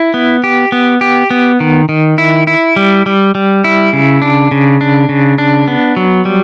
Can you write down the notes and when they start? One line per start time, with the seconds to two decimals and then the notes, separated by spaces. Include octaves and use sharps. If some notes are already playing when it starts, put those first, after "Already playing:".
Already playing: E4
0.14 B3
0.44 G4
0.72 B3
1.01 G4
1.31 B3
1.60 D#3
1.89 D#3
2.18 E4
2.47 E4
2.76 G3
3.06 G3
3.35 G3
3.64 E4
3.93 C#3
4.22 D4
4.51 C#3
4.81 D4
5.09 C#3
5.38 D4
5.68 B3
5.97 F#3
6.25 G3